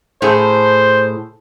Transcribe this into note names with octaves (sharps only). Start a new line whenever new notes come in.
A2 G#4 C5